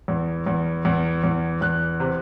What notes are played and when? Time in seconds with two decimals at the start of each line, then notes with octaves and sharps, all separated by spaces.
0.08 E2
0.46 E2
0.85 E2
1.24 E2
1.61 E2 F#6
2.00 C3